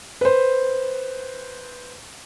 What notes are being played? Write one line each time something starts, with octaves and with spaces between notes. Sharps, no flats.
B4 C5